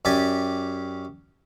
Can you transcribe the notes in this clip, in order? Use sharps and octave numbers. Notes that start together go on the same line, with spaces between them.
F#2 G4 D5 G#5